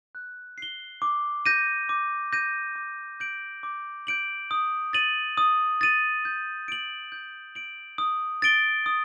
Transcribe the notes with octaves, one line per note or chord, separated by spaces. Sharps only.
F#6
C7 G7
D6
G6 A#6 D#7
D6
G6 A#6 D#7
D6
G6 D7 F#7
D6
G6 D7 F#7
D#6
A6 D#7 F#7
D#6
A6 D#7 F#7
G6
D7 F#7
G6
D7 F#7
D#6
A6 D7 G7
D#6